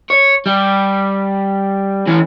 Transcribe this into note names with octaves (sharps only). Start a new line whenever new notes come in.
C#5
G3
E3 C#4